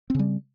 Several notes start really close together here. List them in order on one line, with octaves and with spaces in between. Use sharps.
C4 C#3 G3